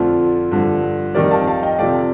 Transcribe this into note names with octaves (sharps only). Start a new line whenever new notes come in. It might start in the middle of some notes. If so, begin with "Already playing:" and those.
Already playing: F2 D3 F3 A3 D4 F4
G2 D3 F3
F2 D#3 G3 A#4 D5
F5 A5
F5 A5
D#5 G5
C3 F3 A3 D5 F5